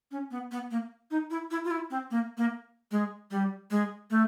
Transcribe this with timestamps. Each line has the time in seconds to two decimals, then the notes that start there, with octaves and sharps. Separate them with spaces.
0.12 C#4
0.31 B3
0.52 B3
0.71 A#3
1.11 D#4
1.31 E4
1.51 E4
1.65 F4
1.71 E4
1.91 C4
2.11 A#3
2.37 A#3
2.91 G#3
3.31 G3
3.71 G#3
4.10 A3